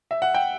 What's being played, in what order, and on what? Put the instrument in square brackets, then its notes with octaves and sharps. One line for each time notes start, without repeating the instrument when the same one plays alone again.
[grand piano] E5
F#5
G5